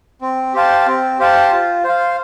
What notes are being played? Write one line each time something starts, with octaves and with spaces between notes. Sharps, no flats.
C4
G4 C5 F5 A5
C4
G4 C5 F5 A5
F4
C5 F5